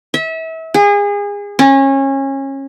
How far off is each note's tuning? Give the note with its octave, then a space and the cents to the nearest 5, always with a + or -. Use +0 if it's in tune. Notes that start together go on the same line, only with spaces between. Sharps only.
E5 -30
G#4 -30
C#4 -25